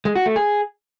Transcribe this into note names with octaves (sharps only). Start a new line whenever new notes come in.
G#3
F#4
A3
G#4